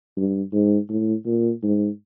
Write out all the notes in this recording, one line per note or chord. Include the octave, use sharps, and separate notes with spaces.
G2
G#2
A2
A#2
G#2